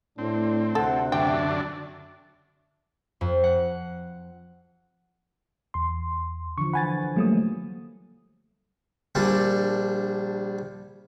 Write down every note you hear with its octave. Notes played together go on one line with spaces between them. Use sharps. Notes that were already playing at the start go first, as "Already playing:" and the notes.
A2 C4 D4
D2 C3 A4 F#5
F#2 D3 D4 E5 G5
F2
F#5
E2 C6
D3 E3 F3 C#6
F#5 G#5 B5 A6
F#3 G3 A3 A#3 D#6
A#1 G3 D4